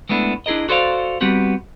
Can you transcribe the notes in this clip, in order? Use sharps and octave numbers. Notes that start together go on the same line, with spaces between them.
G#3 A3 B3 D4 E4
D4 E4 G#4 A#4 D#5
F#4 A4 C5 D5 D#5 F5
G3 B3 C4 F#4 G4